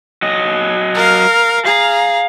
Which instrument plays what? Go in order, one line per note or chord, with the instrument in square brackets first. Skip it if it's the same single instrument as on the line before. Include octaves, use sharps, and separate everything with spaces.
[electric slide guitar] F#3 D#5
[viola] A#4 F5
[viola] G#4 A#5 [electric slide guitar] F5